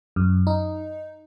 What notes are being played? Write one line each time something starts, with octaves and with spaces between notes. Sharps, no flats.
F#2
D#4